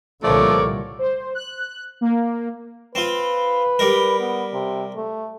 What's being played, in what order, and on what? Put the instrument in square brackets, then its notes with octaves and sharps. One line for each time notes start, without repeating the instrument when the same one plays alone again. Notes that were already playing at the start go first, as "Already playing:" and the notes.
[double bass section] C2 A#2 D3 [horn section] F3 A3 [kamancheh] A#4 C#5 [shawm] D5
[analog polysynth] C5
F#6
A#3
[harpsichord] C4 F4 [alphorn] B4
[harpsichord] G3 A#4
[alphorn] B3
C3
A3